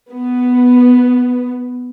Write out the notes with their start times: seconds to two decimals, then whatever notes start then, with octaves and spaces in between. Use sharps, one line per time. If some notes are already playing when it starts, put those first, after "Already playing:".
0.11 B3